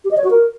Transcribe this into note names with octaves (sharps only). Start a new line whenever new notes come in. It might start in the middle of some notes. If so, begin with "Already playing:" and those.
G4
D#5
C#5
F#4
A#4